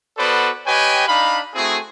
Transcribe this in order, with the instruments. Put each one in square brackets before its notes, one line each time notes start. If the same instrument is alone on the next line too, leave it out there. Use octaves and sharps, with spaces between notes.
[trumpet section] B3 F#4 A4 B4 C5 D5
G4 B4 C#5 D#5 G5 G#5
D4 D#4 F5 B5
A3 C4 E4 F#4 G#4